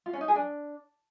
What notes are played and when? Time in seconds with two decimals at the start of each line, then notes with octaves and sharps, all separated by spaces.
0.06 F4
0.13 C#4
0.21 D#4
0.28 G#4
0.36 D4